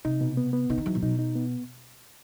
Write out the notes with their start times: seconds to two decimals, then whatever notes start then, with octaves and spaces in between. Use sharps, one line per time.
0.05 C3 D#4
0.21 B2
0.37 B3
0.53 B3
0.70 C#3 D#4
0.78 D#3
0.86 E3 F#3
0.95 A#2
1.02 B2 D#4
1.19 D#4
1.35 B3